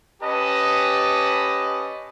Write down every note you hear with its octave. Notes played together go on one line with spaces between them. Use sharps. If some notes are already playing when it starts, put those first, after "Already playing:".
C#4 G4 B4 D#5 A5